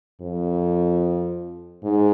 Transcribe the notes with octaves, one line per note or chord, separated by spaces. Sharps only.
F2
G#2